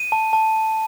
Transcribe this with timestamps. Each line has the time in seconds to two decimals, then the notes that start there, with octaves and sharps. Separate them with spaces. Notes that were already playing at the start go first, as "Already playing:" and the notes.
Already playing: D#7
0.12 A5
0.33 A5